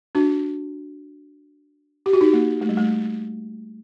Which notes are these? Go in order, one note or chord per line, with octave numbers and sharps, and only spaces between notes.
D4 F#4
G4
F#4
D#4 G4
A#3
A3
G3
A3